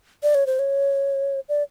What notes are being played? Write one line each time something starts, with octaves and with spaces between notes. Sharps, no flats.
D5
C#5
C5
C#5
D5